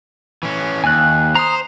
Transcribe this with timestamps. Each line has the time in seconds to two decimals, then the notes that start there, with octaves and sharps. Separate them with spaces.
0.43 E3 C#4
0.84 D#2 G#5 F#6
1.35 C5 A#5 D#6